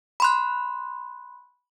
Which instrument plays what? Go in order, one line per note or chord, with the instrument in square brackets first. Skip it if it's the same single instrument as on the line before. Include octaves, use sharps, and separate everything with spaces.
[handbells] B5 C6 F#6